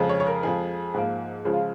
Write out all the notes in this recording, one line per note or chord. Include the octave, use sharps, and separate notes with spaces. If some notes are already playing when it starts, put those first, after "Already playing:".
Already playing: F2 C#3 F3 G#3
C#5
C#5
A#4
F2 F3 G#3 G#4
G#2 F3 A#3
C#2 C#3 F3 G#3 G#4
F4